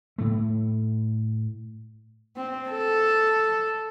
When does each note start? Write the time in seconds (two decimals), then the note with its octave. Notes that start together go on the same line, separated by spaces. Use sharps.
0.18 A2 A3
2.36 C4
2.70 A4